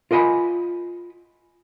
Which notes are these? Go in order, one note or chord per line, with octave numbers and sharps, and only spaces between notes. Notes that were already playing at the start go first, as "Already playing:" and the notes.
F4 A#4 D#5 G#5 B5